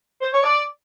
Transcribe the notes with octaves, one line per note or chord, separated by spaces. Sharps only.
C5
C#5
D5